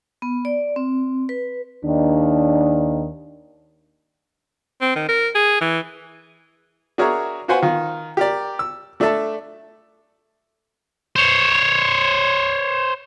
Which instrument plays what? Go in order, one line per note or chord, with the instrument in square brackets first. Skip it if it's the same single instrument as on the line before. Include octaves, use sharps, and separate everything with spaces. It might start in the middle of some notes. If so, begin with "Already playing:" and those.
[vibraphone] B3
D5
C4
B4
[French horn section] D#2 D#3 D4
[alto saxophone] C4
D#3
A#4
G#4
E3
[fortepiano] D4 F#4 G#4 A#4 C#5 E5
F4 F#4 B4 C5 F#5 G#5
D#3 F4
G4 A#4 D5
E6
A3 D4 A4 E5 A5
[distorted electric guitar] C5 C#5